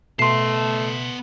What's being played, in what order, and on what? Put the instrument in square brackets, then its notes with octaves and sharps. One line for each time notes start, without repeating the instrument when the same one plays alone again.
[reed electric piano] B2 [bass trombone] A3 [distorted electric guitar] B3 A5 [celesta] C6 C7